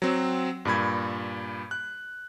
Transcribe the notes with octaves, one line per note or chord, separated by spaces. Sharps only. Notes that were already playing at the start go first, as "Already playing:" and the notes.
F#3 C4
G2 A#2 B5 G#6
F#6